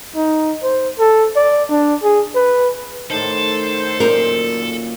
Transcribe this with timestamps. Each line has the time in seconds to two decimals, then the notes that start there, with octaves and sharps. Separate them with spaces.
0.16 D#4
0.63 C5
0.99 A4
1.36 D5
1.69 D4
2.03 G#4
2.35 B4
3.10 A2 D#3 A4 C5
4.00 F#2 A#2 A#4